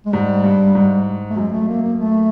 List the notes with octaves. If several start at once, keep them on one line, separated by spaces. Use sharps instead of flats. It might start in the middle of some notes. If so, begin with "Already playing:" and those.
G#3
G#2 G3
G2
G#2
A3
F#2 G#3
A3
A#3
A#3
A3